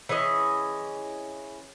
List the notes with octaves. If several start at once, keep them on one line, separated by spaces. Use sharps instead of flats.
E3 C#4 G#4 D#5